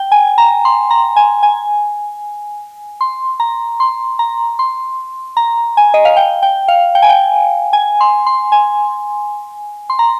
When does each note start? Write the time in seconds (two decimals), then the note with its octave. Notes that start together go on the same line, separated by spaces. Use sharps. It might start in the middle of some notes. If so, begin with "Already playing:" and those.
Already playing: G5
0.12 G#5
0.38 A#5
0.65 C6
0.90 A#5
1.16 G#5
1.43 G#5
3.01 C6
3.40 A#5
3.80 C6
4.19 A#5
4.59 C6
5.37 A#5
5.77 G#5
5.94 D#5
6.05 F5
6.17 G5
6.43 G5
6.68 F5
6.95 G5
7.02 G#5
7.09 G5
7.73 G#5
8.01 C6
8.26 C6
8.52 G#5
9.90 C6
9.99 A#5